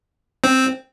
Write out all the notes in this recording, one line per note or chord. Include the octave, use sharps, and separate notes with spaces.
C4